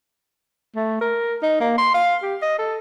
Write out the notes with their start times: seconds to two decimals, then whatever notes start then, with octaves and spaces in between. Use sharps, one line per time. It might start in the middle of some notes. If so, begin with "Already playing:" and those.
0.75 A3
1.01 A#4
1.43 D#4
1.60 A#3
1.78 C6
1.94 F5
2.22 G4
2.42 D#5
2.58 A4